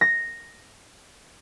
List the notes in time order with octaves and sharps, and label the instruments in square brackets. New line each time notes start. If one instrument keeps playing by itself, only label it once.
[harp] A#6